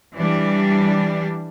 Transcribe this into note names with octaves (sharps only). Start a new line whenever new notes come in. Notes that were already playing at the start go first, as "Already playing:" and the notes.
E3 G3 D4